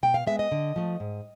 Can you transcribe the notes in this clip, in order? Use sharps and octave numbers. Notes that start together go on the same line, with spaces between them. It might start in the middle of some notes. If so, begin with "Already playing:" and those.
B2 G5
F5
G#3 B3 E5
D#5
D3
F3 A3
G#2